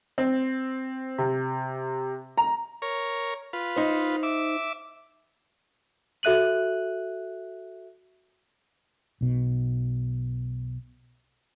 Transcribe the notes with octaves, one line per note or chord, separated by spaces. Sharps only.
C4
C3
A#5
A#4 C#5
F4 B4
D#4 C5
E5 D6
F#4 A4 E5 F#6 D#7 F#7
B1 B2